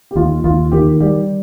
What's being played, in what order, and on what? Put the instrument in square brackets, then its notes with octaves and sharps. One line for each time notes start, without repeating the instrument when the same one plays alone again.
[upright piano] G4
[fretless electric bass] D#2 [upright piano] F4
[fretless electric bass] D#2 [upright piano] F4
[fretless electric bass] D#3 [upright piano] G4
[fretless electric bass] G3 [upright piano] G4